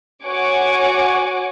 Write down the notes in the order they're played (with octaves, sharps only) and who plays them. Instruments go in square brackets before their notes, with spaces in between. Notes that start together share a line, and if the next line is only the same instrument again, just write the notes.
[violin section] F#4 C#5 F#5 G#5 C#6 D6